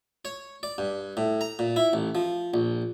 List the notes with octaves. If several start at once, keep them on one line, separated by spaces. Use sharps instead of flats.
C#5
D5
G2
A2
A#5
A#2
E4
A1
F3
A#1